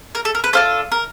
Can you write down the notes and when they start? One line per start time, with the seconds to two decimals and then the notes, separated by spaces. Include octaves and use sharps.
0.15 A#4
0.25 A4
0.35 A#4
0.44 B4
0.53 D4 F4 A4 C5
0.92 A#4